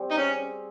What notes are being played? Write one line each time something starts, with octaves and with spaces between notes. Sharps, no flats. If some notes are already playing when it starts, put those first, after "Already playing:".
Already playing: G3 C4
D#4
C#4 G#4